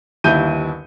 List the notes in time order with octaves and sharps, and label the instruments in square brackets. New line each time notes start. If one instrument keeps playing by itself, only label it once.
[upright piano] G1 D#2 E4 G6 D#7